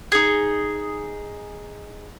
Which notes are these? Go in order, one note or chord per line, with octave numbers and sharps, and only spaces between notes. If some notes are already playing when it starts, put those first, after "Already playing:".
D#4 G#4